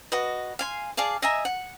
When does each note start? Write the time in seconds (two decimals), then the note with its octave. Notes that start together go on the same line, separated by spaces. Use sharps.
0.12 F#4 B4 D#5
0.59 F5 G#5 C6
0.97 G#4 D5 F5 A5
1.22 D#5 E5 G#5 A#5
1.45 F#5